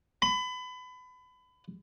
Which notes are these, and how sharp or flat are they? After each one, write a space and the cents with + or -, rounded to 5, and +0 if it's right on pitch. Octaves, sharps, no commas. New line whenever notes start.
B5 +30